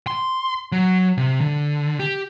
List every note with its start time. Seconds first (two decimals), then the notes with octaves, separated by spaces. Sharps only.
0.07 C6
0.72 F#3
1.18 C3
1.41 D3
2.00 G4